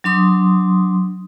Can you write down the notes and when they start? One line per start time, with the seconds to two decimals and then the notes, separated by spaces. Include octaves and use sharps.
0.04 F#3 D4 C6 D#6